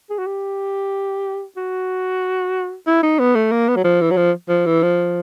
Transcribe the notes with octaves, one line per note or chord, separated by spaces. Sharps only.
G#4
F#4
G4
F#4
E4
D#4
B3
A3
A#3
B3
F#3
F3
E3
F#3
F3
F3
E3
F3